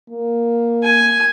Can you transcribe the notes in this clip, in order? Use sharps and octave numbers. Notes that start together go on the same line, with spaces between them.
A#3
G#5